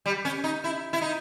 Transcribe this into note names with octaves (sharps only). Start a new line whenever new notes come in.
G3
C#4
D#4
E4
E4
D#4